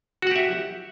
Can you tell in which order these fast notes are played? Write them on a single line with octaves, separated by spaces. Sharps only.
F#4 F#5 G4 E5